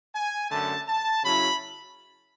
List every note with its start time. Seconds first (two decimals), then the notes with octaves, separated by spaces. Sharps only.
0.15 G#5
0.50 F#2 D3 A3 A5
0.87 A5
1.24 C#3 F#3 C#4 E4 B5